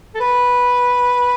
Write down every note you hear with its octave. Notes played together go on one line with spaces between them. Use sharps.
A4
B4